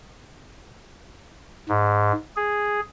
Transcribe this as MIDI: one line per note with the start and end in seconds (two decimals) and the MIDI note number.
1.69 2.13 44
2.36 2.80 68